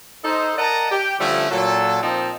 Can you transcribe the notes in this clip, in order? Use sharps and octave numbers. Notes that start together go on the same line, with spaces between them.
D#4 A4 C5
A#4 D5 D#5 F#5 A5 A#5
G4
D3 F3 G3 A3 C#4 E4
A#2 F#3 A4
A#2 F3 C4 D#4 A5